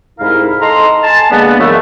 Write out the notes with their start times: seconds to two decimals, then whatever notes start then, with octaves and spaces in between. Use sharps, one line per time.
0.20 C2 G#2 E4 A#4 F5
0.61 A4 D#5 A#5 C6
1.04 G#5 A5
1.31 D3 G#3 A#3 B3
1.59 F#2 C#3 E3 A3